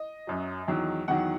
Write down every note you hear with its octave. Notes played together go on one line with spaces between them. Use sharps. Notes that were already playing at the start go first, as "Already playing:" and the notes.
Already playing: D#5
F#2 F#3
E2 D#3 F#3
E2 D#3 F#3 F#5